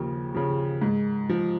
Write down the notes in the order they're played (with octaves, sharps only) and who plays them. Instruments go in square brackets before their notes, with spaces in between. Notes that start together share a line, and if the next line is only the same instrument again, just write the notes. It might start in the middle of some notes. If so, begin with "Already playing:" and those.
Already playing: [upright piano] D#2 C#3 F3
C#3 F3
G#2
F3